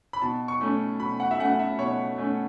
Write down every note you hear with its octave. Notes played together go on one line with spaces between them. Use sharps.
B5
B2 A5
C#6
A3 C#4
B2 B5
F#5
E5
A3 C#4 F#5
E5
B2 C#5
A3 C#4